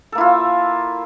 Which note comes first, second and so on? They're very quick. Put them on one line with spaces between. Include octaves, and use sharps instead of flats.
A4 A#3 E4 F4